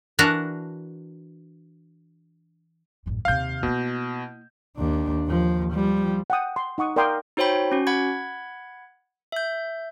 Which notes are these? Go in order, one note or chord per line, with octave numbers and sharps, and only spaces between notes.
E3 D4 F#4 A#4 A5 A#5
A1 F#2
D#2 C3 F5 G6
B2 A#3 E4
D#2 D4
D#2 F3
F3 G3
F#5 G5 D#6
C6
D#4 F#5 C#6 D#6
A#4 D5 F5 G5 C6 D#6
D#4 F#4 C5 C#5 G5 B5
C#4 F#4
F#5 B5 G#6
E5 G6